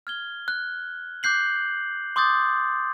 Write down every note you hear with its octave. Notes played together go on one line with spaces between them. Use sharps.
F6 G#6 G7
F#6
D6 F#6 G6 C7 F#7
C6 D6 D#6 G6 A6